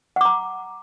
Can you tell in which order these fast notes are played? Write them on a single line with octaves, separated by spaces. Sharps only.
F#5 D6 A#5